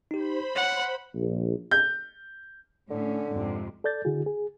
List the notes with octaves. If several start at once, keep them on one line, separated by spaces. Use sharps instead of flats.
D#4 G4 C5 B5
C#5 F#5
A#1
G6
A2 D3 C#4
F2 G#2 C3
A4 D5 G6 A6
D3 E4 F#4 G#4
G#4